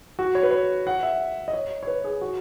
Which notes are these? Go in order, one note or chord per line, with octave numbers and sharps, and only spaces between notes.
F#4
C#5
B4
C#5
F#5
E5
D#5
C#5
C#5
B4
G#4
F#4